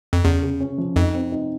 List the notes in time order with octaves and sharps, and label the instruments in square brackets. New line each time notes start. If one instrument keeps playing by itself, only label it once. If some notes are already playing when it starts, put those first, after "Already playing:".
[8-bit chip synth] F2
[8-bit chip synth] E2 [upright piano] C#3
[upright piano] C#3
C#4
F3
[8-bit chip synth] F2 [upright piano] D#4
[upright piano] C4
D#4